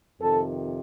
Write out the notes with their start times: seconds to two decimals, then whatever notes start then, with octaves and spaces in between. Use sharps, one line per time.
0.20 F2 C3 D#3 A4